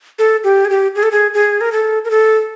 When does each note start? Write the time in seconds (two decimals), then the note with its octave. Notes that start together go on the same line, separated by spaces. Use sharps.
0.19 A4
0.44 G4
0.65 G#4
0.70 G4
0.95 G#4
1.03 A4
1.12 G#4
1.34 G#4
1.61 A#4
1.72 A4
2.05 A#4
2.11 A4